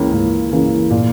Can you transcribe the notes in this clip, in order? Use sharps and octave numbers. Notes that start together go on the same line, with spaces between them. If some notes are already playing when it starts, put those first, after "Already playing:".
Already playing: C#2 C#3 E3 A#3 C#4
C#2
C#3 E3 A#3 C#4
A#2